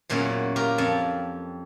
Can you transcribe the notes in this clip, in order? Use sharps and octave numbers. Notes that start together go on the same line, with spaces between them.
E2 A#2 F#3 C#4 E4 F#5
F4 G4 A#4
F2 A5